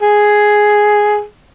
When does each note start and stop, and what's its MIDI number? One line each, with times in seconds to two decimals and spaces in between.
0.01 1.23 68